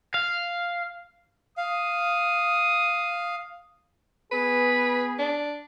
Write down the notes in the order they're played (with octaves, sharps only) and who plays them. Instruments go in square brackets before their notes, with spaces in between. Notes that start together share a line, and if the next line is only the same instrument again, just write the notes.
[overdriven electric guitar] F5
[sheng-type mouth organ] F5 [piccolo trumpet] D#6
[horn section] B3 G#4 [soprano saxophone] B4
[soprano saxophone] D4